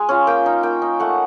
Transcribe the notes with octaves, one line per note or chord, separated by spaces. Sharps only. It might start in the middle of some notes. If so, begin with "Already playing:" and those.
Already playing: G#3 G#5
C#4 F4
A#3 G5
D#4
A#3 G5
D#4
A3 F#5